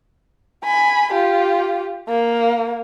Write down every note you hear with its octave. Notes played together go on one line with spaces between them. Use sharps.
G#5 B5
F4 G4
A#3